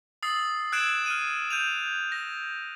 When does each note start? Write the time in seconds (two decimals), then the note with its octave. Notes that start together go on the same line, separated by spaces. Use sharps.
0.23 D#6 E6 A6 C7 F#7
0.72 E6 F#6 G#6 C7 D7 E7
1.06 F6 F#6 D#7
1.50 G6 D#7 F7
2.12 A#6